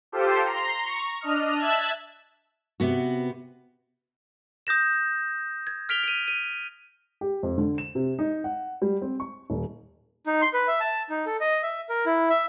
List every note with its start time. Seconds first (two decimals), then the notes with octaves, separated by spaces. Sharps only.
0.12 F4 G4 A4 C5
0.44 A#5 C6
0.82 A#5 C#6
1.21 D4 D#5 F6
1.59 E5 A5 E6 F#6 G#6
2.80 C3 B3 F#4
4.67 D#6 G6 A#6 E7
5.67 G#6
5.89 F6 B6 D7 F7 G7
6.03 D7 D#7
6.28 D#7
7.21 G4
7.43 F2
7.58 D3
7.78 E7
7.95 C3
8.19 D#4
8.44 F#5
8.82 G3
9.02 C4
9.20 C#6
9.50 D#1
10.27 D#4
10.42 C6
10.54 B4
10.68 E5
10.80 A5
11.10 D#4
11.26 A4
11.40 D#5
11.63 E5
11.89 A#4
12.06 E4
12.30 E5